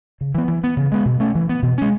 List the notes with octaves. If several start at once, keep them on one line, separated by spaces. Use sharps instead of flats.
C#3
E3 B3
E3
B3
C#3
G#3 B3
B2
A3 C#4
E3
B3
B2
G#3 C#4